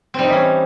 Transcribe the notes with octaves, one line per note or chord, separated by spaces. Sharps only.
E3 G3 C4 C#4 D#4